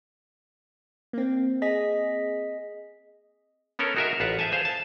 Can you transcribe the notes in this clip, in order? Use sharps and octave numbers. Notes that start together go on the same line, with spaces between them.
A#3 C4
G#4 D#5 B6
B3 C#4 A4 A#4 C#5
D#4 F#4 G#4 A#4 D#5 E5
A1 F4 B4 F5 F#5
G#4 C5 E5 G#5 A5
G#4 C5 F5
A5